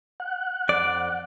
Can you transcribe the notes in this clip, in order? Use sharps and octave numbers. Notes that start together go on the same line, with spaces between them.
F#5
F2 D5